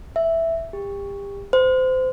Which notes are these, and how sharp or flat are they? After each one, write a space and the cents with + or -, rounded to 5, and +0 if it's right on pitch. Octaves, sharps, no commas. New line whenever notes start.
E5 +0
G4 +30
C5 -25